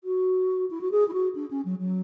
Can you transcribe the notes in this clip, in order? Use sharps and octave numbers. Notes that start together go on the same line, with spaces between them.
F#4
E4
F#4
G#4
E4
F#4
D4
C#4
F#3
F#3